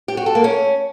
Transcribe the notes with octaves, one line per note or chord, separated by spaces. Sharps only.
G4
F#4
A4
A#3
C#4